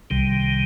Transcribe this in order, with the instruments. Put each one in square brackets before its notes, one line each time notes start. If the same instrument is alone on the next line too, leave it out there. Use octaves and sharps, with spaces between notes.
[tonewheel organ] C2 C3 D#3 G3